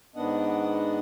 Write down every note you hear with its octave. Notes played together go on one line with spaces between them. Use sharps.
G#2 D#3 B3 D4 D#5 F#5